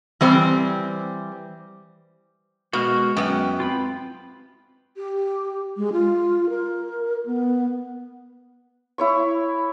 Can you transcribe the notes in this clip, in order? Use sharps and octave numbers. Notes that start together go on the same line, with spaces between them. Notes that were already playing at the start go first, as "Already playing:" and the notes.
E3 G3 C4 C5
B2 G#3 F#4 A#4 F6
F#2 B3 G5
C4 F4 G5 B5
G4
G#3
F4
A#4
B3
E4 C#5 C#6